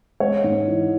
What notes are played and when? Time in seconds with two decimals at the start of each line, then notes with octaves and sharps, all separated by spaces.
0.20 G#3 C#5
0.44 G#2
0.68 E3